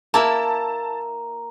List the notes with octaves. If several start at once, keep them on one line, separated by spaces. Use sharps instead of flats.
A#3 E4 A5 A#5